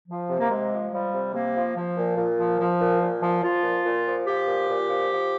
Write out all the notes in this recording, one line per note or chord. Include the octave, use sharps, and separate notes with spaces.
F3
C3
A#3
C3 G#3
F3
F3 G3
C3
C3 A#3
F3
F3
A#2
A#2
F3
F3
A#2
A#2
F3
F3 F4
A#2
A#2
F3
F3 G4
A#2
A#2
F3
F3